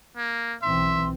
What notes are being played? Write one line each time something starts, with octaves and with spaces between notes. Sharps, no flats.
A#3
B1 E3 C4 E5 C6